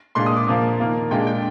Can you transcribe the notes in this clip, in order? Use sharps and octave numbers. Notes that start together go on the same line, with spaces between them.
A#2 G#3 D4 F4 C6
D#6
D6
A#2 F3 A#3 F4
D#3 A#3 F4
A#2 G#3 D4 F4 G5
G5